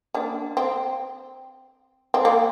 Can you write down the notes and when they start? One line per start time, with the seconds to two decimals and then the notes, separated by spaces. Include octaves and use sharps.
0.14 A#3 D4
0.57 C4
2.14 C4
2.25 A#3